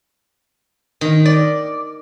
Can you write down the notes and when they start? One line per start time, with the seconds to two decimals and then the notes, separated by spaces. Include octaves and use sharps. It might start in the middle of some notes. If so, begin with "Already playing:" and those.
1.01 D#3
1.25 D5